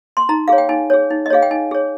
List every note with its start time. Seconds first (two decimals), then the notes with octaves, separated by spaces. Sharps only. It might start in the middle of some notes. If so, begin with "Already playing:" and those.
0.17 C6
0.29 D#4 A#5
0.48 G#4 C#5 F5
0.58 G5
0.69 D#4 G#5
0.90 G#4 C#5
1.10 D#4
1.26 D#5
1.30 G#4 C#5 F5
1.42 G5
1.51 D#4 G#5
1.71 G#4 C#5